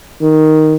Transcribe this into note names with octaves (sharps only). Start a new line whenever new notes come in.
D#3